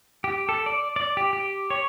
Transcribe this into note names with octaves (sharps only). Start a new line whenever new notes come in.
G4
A4
D5
D5
G4
G4
C#5